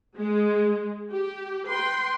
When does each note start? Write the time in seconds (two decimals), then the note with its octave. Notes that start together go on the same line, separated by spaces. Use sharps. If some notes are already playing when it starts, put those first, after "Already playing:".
0.16 G#3
1.11 G4
1.68 B4 G5 C6